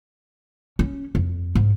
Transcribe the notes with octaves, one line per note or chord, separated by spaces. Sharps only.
C#4
F2
G#2